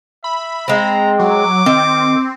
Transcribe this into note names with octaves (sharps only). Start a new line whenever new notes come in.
E5 B5
G#3 C4 A#5
F#3 D6
D#3 C4